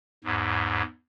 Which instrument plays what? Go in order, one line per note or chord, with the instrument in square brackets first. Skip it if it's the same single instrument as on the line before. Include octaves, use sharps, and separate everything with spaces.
[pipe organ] E2 G#2